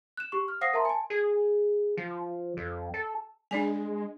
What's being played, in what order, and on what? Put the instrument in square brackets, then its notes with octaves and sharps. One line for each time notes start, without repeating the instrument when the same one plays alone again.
[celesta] F#6 E7
G4 C#6
F6
C5 F5 F#5 D#6 A#6 C7
A#4 E5 A5 A#5 C6
G#5 A5
[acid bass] G#4
F3
F2
A4
[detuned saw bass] G#3 [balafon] D4 D5 G#5